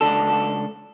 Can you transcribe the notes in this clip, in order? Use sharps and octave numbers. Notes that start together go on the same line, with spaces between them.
C#2 D4 A4